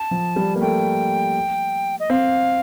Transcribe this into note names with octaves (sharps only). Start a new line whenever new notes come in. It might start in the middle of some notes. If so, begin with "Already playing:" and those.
Already playing: A5
F3
G3
A#3
A3 G5
D#5
C4 F5